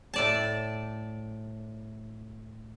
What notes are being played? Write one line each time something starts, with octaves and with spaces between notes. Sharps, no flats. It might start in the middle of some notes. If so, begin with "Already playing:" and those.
A2 D5 A5